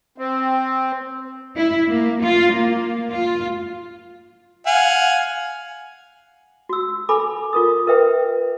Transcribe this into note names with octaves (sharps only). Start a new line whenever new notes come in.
C4
E4
A#3
F4
A#3
F4
F5 F#5 G#5
F#4 E6
A4 G#5 B5 D6
F4 A#4 D#6
A#4 B4 E5 G5